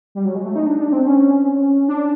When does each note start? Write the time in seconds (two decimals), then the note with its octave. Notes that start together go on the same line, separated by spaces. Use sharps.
0.15 G3
0.25 F#3
0.35 G#3
0.45 A3
0.56 D#4
0.66 D4
0.79 D4
0.92 C4
1.07 C#4
1.88 D4